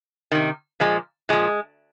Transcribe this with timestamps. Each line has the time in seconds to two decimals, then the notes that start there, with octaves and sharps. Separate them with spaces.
0.31 C3 D#3
0.80 A#2 F3 G#3
1.29 A#2 F3 G#3